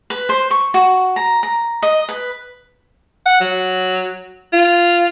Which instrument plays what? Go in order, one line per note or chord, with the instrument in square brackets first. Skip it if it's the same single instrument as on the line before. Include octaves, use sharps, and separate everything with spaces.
[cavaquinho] B4
C5
C#6
F#4
A#5
A#5
D#5
B4
[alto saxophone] F#5
F#3
F4